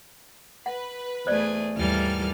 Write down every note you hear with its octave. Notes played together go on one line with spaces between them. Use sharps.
B4 F#5
E2 A3 G#4 C5 D5
D#2 G#2 E3 G3 A4 F6